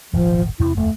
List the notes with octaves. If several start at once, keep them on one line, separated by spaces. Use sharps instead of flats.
D#1 G#1 D#2 F3
E2 C3 C4 E4
D1 F2 F3 A3